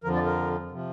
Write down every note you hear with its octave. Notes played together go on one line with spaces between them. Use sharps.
F2 D3 F3 A#4
D5
A#4
C3 F3